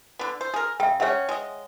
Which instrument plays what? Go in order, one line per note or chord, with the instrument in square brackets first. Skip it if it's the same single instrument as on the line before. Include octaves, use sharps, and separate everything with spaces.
[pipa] D3 B3
C5
G#4 A#4
[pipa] C#3 [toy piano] E5 G5
[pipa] F#3 C#4 [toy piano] C#5 E5 F#5
[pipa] G#3 D#5